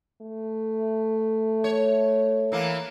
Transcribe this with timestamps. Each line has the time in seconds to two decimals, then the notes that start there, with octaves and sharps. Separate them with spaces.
0.21 A3
1.64 C#5
2.52 E3 A#3